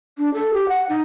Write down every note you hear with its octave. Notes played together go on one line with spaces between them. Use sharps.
D4
A4
G4
F#5
D#4